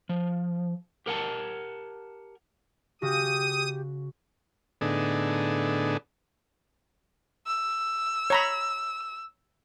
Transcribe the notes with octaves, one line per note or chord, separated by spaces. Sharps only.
F3
G4 A#4 F#5 G#5 A5
C#3 F#4 G4 D#6
A2 D3 B3 D4 D#4 G#4
E6
C#5 A#5 B5